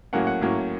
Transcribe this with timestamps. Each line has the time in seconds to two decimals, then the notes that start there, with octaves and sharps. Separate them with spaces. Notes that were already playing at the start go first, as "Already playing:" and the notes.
0.13 A2 F#3 A#3 C#4 F#5
0.27 F#5
0.41 A2 F#3 A#3 C#4